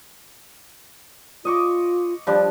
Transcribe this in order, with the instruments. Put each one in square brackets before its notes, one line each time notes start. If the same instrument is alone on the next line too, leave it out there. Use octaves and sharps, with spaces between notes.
[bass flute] F4 [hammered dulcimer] D#5 C#6 D6
[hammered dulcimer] F3 G3 D4